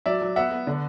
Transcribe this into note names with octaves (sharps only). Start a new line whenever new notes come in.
F#3 D5 E5
F#3
B3 E5 F#5
B3
D3